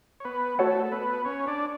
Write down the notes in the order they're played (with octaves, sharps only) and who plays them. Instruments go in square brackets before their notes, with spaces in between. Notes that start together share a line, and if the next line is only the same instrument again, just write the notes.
[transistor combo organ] C#5
B3 B4
[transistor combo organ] A3 A4 [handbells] F#4 C#5 F#5
[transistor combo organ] A4
B3 B4
C#4 C#5
D4 D5